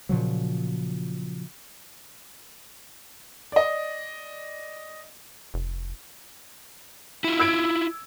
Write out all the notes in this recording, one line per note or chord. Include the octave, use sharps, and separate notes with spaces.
A#2 C#3 F3 F#3
D5 D#5
F1
E4 F4
E6 G#6 D7